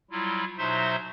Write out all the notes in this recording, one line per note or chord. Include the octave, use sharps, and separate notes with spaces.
F#3 G3 E4 F4
B2 F#3 D#4 C5 E5 C6